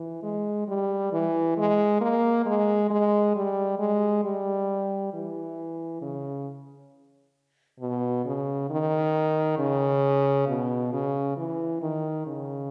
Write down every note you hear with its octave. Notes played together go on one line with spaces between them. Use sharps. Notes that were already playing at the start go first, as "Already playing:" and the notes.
Already playing: E3
G#3
G3
E3
G#3
A#3
G#3
G#3
G3
G#3
G3
E3
C#3
B2
C#3
D#3
C#3
B2
C#3
E3
D#3
C#3